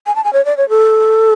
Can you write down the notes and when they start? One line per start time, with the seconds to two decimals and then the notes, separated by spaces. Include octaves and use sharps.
0.06 G#5
0.15 A5
0.24 G#5
0.33 C#5
0.45 D5
0.57 C#5
0.69 A4